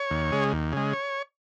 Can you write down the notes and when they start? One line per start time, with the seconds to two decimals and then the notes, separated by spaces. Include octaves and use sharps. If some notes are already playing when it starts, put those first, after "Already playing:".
Already playing: C#5
0.11 D#2
0.32 C#3 G#3
0.53 D#2
0.73 C#3 G#3
0.93 C#5